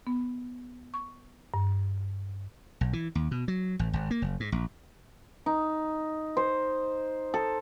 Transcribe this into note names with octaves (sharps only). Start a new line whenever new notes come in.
B3
C#6
G2
B1
E3
D#2
B2
F#3
A1
G#1
A#3
F#1
G#2
A#1
D#4
C5
A4